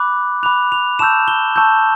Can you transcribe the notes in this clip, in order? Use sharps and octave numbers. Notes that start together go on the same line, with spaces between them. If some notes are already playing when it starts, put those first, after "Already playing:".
Already playing: B5 D6 F#6
B5 D6 F#6 F7
F7
A5 C#6 E6 G6 E7
G7
A5 C#6 E6 G6